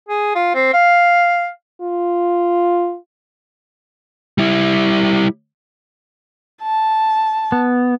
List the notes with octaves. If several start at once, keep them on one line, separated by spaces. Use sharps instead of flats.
G#4
F4
C4
F5
F4
G3 E4
A5
B3